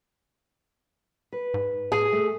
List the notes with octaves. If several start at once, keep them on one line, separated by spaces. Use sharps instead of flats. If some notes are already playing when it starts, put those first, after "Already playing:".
B4
G#2
A2 G#4
A3